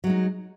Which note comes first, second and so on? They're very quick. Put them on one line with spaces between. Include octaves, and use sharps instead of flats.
F#3 G#3 D#4